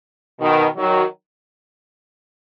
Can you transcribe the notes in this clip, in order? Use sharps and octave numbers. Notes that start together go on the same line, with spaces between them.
B2 D#3
D#3 F#3